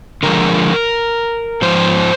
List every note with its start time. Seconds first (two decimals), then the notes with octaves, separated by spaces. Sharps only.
0.23 D3 F3 G#3 A#4
1.62 G#2 F3 C5